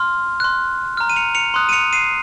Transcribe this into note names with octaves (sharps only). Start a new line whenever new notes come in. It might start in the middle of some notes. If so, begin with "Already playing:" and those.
Already playing: C6 F6
C6 F#6
A#5 F6
D#7
C#7 F7
C#7 F7
C6 D#6 F#6
D#7
C#7 F7
C7 D#7